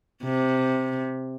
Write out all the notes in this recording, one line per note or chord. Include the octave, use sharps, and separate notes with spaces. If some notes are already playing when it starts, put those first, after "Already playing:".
C3